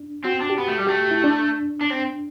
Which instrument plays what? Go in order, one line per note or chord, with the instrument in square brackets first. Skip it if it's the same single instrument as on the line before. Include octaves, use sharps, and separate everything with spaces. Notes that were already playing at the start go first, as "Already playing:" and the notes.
Already playing: [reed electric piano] D4
[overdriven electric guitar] C4 [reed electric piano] F#4
[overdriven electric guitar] D4
[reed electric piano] G4
[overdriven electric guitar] B3
A3
G3
[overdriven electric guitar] A3 [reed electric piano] G4
[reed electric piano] E4
D4
[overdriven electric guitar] D4
C4